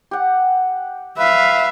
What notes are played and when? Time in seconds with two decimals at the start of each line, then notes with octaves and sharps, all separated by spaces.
0.11 G4 F#5
1.19 B4 E5 F5